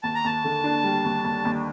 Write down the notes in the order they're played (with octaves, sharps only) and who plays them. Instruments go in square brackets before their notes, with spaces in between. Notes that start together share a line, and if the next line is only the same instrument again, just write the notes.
[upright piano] D#2 [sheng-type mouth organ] A5
[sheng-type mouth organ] A#5
[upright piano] D#2 [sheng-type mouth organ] A5
[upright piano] D3
D4
G3
D#2
D#2
D#2